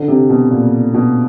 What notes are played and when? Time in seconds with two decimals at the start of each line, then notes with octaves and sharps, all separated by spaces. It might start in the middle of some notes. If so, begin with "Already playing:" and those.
Already playing: D3
0.08 C3
0.30 B2
0.51 A#2
0.94 B2